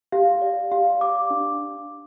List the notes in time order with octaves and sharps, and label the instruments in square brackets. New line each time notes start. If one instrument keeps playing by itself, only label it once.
[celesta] G4 F5
D5
G4 F5
D5 D6
D4